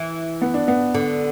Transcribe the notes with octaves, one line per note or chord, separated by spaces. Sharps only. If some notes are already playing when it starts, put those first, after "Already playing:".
Already playing: E3
B3
D4
B3
D3